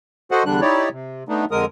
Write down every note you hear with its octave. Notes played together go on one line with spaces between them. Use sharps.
F#4 A4 C5 D#5 F#5
E2 D3 G3 D4 F#6
D#4 E4 G4 C#5 D5
C3
A3 B3 D4 D#4
F2 D3 G#3 A#4 D#6